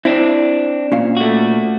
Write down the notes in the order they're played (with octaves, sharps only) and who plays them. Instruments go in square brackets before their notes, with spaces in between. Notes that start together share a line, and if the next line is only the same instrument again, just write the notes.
[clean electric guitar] C4 D4 [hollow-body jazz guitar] E4
[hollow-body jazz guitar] A#2 C#4 F5
[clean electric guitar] A3 F#4